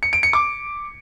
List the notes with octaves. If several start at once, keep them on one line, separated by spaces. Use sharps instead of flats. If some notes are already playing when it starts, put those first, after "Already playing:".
C#7
D7
C#7
D6